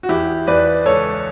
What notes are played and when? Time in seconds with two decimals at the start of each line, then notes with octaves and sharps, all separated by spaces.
0.03 F#4
0.09 E2 E4 G4
0.47 E2 B4 D5
0.86 C#2 A4 C#5